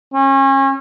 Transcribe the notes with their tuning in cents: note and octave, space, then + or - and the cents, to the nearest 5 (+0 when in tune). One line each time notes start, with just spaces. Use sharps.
C#4 -35